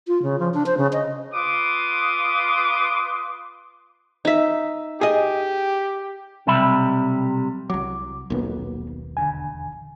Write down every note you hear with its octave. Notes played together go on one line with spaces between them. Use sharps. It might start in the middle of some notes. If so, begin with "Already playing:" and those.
F4
C#3
F3
D4
C5
C#3
D#5
F4 B4 C6 D6 D#6
D#4 E5
G4 G#4 D#5
B1 C3 G3 G4 E5 B5
C2 F#3 D6
D#1 B1 A#3 B3
E2 D3 G#5